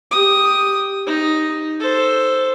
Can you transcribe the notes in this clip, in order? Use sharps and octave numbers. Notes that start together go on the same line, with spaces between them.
G4 D#6
D#4
A4 C5